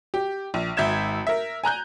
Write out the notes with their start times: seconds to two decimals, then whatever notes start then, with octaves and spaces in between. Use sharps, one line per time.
0.14 G4
0.54 A#1
0.77 G#1 E5 G6 G#6 E7
1.27 A#4 E5
1.64 G#5 A#5 F#6 G6